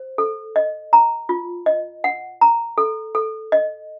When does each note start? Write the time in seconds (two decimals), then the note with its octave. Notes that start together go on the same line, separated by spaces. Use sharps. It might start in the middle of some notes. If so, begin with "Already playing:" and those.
Already playing: C5
0.18 A4
0.56 D#5
0.93 A#5
1.29 F4
1.66 D#5
2.04 F#5
2.41 A#5
2.78 A4
3.15 A4
3.52 D#5